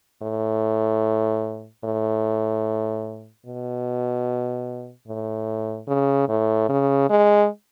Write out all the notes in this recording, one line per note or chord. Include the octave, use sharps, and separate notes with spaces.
A2
A2
B2
A2
C#3
A2
C#3
G#3